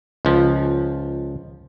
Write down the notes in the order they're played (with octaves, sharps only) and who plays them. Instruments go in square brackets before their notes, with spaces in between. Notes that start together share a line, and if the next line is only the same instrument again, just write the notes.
[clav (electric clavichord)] C#2 F3